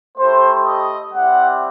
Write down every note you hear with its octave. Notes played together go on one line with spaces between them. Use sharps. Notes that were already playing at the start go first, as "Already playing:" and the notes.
A3 E4 G4 C5
D#5
G3 C4 E4 G4 F#5